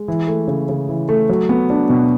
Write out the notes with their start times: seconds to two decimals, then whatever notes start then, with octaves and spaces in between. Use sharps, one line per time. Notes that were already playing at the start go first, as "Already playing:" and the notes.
Already playing: G#3
0.08 E3
0.27 A3
0.48 C#3
0.69 C#3
0.89 E3
1.09 A3
1.29 F#3
1.49 B3
1.70 D4
1.89 B2